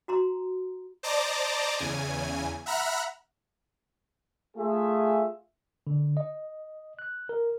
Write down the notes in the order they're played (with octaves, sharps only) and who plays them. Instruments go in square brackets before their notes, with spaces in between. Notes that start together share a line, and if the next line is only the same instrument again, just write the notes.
[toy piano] F#4 A#5 C6
[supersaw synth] C5 D5 D#5 A5 A#5 D6
E2 C#3 G#5
E5 F#5 A#5 B5 F6 F#6
[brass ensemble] A3 F4 G#4 E5
[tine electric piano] D3
D#5
F#6
A#4